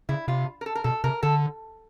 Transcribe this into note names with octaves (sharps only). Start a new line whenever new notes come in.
C#3 E4
C3 F4
A#4
A4
A#4
B2 A4
C3 A#4
D3 A4